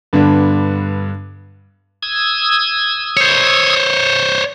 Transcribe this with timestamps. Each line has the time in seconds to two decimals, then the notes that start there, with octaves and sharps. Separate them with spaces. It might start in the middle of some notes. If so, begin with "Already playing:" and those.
0.13 G2 D3 B3 D4
2.02 D#6 E6 G#6
3.17 C5 C#5